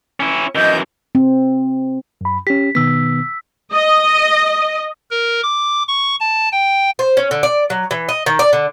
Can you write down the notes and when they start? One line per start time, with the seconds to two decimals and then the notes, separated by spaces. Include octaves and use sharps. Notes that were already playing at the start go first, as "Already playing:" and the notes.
0.20 C#4 E4
0.55 F#2 E3 D#5 G6
1.15 C4
2.21 F#2 B5
2.47 C#4 G4 B6
2.75 B2 D#3 B3 E6 B6
3.73 D#5
5.11 A#4
5.43 D6
5.88 C#6
6.20 A5
6.52 G5
6.99 C5
7.17 C#4
7.31 D3
7.43 D5
7.70 F#3
7.91 E3
8.09 D#5
8.26 D#3
8.39 D5
8.53 D3